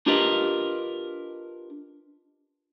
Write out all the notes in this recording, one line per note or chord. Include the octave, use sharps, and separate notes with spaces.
D4 F4 G4 A#4 B4 D#5